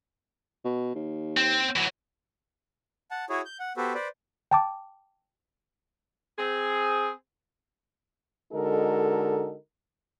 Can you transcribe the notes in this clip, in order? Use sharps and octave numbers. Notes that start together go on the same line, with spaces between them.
B2
D#2
C4
E3 F#3
F#5 A5
E4 F#4 G#4 C#5
G6
F#5
B3 F#4 G4 A4 B4 C5
B4 C5 D5
G5 A5 D6
C4 G#4
D3 G#3 D#4 F#4 A4 A#4